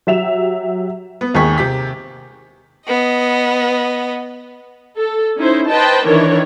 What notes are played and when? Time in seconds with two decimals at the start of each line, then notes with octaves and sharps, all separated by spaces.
0.07 F#3 G4 E5 E7 F7
1.21 B3
1.34 G#1 D#2 D#3 G#4 C#6 B6
1.58 C3 G4 B6
2.87 B3 D#5
4.97 A4
5.37 C#4 D#4 E4 C5
5.69 B4 C5 D#5 G5 A5
6.06 D#3 E3 D4 A#4 C#5